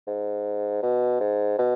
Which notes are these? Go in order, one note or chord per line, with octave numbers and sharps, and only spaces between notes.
G#2
B2
G#2
B2